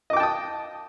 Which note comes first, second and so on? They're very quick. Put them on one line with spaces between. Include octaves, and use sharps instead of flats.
D#5 D6 G5 A5 D#6